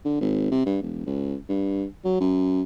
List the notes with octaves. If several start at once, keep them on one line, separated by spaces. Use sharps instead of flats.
D3
G#1
C3
G2
E1
C#2
G2
F#3
F#2